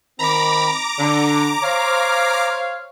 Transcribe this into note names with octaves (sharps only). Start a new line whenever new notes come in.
D#3 C4 A#5 B5 D6
D3
C5 C#5 F5